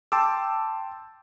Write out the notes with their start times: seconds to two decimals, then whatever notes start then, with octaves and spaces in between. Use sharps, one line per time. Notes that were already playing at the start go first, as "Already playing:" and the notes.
0.12 G5 A5 C6 D6 E6